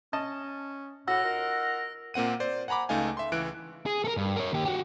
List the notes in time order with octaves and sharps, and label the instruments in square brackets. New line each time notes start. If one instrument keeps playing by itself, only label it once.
[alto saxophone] C#4 [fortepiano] D#5 A5
[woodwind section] A2 [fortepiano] F#4 [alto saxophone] F#5 [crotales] E6 A#6
[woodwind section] D#4 F4 A#4
[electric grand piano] A#2 A#3 C4 F#5 D#7
C5 D5
F#5 G#5 A#5 B5 D6
C#2 A3 D#4 F5 G#5
E5 C6
C#2 E3 F#6 D7
[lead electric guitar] G#4
A4 A#4
G2
A#4 C#5
D#2 G4
F#4 G4